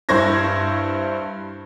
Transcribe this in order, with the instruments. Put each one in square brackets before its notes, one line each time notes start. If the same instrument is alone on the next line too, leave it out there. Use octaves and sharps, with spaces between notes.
[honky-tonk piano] G2 E4 C5 C#6 G#6 A#6